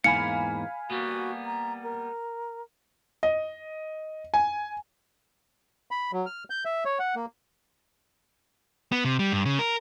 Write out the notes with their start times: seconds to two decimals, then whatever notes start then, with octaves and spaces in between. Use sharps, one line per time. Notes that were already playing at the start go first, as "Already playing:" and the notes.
0.04 E2 G#2 A#3 F5 G#5 B5 C#7
0.90 G3 A#3 B3 F#4
1.45 A#5
1.83 A#4
3.23 D#5
4.34 G#5
5.91 B5
6.13 F#3
6.26 F6
6.50 G6
6.65 E5
6.85 C#5
6.99 F#5
7.15 A#3
8.92 B3
9.05 C3
9.19 G3
9.32 G2
9.46 C#3
9.59 A#4